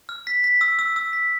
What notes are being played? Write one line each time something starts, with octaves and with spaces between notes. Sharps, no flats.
F6
B6
B6
E6
E6
E6
B6